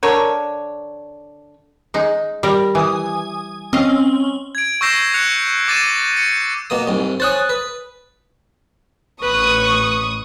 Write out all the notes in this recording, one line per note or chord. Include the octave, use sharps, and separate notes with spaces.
D3 A#4 C#5
G#3 D#4
G3 A#4
E3 G#5 D#6
C4 C#4 D#5 F5
G#6 D7
C#6 E6 G6 A#6 C7 E7
F#6 C#7 F7
D6 A6 D#7 E7
C#7
B2 A#3 D#6
C2 G#2
C5 C#5 G#5 D#6 F#6 A6
B4
A1 B4 C#6 D#6